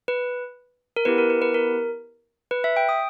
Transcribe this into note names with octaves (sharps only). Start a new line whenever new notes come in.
B4
A#4
B3 E4 G4 B4
A#4
B4
B4
A#4
B4
E5
G5
D#6